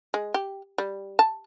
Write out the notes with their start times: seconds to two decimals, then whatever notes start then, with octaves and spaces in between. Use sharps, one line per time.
0.14 G#3
0.34 G4
0.78 G3
1.19 A5